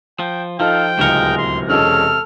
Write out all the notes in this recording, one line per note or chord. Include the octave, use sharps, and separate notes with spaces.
F3 G5
F3 D#4 F4 A4 G5
D1 C#2 C3 G#3 A#4 C#7
C6
E1 G#3 C#4 A4 F6